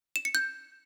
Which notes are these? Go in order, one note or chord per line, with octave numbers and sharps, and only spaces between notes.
E7
C#7
G6